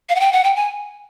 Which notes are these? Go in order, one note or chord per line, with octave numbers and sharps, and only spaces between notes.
F5
F#5
G5
F#5
G5
G#5